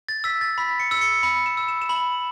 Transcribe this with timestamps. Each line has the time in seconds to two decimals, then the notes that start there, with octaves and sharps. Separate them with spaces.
0.09 A6
0.24 E6 B6
0.41 A6
0.58 B5 B6
0.80 C#7
0.91 E6
1.01 C#7
1.23 B5 C#7
1.46 E7
1.57 E6
1.68 E7
1.82 E7
1.89 B5 F#7